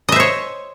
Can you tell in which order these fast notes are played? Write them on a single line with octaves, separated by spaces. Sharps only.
D#5 E5 C5 C#5